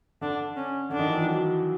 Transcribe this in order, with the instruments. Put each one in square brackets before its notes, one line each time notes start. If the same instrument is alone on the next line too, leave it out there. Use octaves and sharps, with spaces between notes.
[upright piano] D3 [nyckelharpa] D4
[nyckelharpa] C#4
[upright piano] D3 [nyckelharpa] D4
[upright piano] D#3
E3
F3
F#3